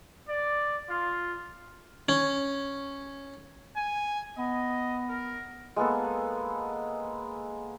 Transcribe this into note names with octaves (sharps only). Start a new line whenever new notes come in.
D5
F4
C#4
G#5
B3 D#5
A#4
G#3 A#3 B3 A4